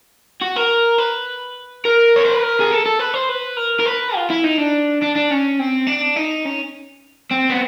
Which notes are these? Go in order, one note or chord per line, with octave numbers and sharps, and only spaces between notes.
F#4
A#4
B4
A#4
C#5
C5
B4
A#4
G#4
A4
A4
B4
C5
B4
A#4
A#4
B4
F4
E4
D#4
D4
D4
D4
C#4
C4
D4
D#4
C#4
C4
B3